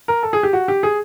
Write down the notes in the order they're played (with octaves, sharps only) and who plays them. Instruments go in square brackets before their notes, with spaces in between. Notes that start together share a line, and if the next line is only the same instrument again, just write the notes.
[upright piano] A#4
A4
G#4
G4
F#4
G4
G#4